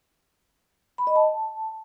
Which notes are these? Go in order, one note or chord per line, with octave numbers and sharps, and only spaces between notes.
B5
D#5
A5